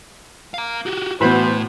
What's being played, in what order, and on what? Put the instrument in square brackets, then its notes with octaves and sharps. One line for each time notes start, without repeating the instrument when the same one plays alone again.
[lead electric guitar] F5 A#5
F#4 G4
[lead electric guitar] A2 [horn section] E3 F#4 C5 [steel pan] B3 B5